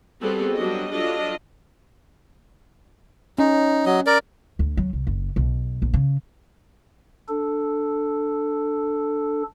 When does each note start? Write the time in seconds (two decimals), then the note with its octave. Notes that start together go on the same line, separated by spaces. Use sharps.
0.21 G3 B3 C4 F#4 G#4 A4
0.56 F#3 G3 B3 D4 F#4 D#5
0.92 F#3 D4 F4 A4 D#5
3.38 C#4 D#4
3.86 F#3 D#5
4.07 A#4 D5
4.59 D2
4.77 F#3
4.93 C2
5.07 F#1
5.36 B1
5.82 A#1
5.94 C#3
7.28 D4 A4